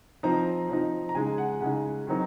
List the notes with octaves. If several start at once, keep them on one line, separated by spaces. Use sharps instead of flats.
F3 C4 D#4 A#5
F3 C4 D#4
A#5
C#3 G#3 D#4 G#5
F#5
C#3 G#3 D#4 F#5
D#3 F#3 C4 D#4